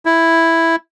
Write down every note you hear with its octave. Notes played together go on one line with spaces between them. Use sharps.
E4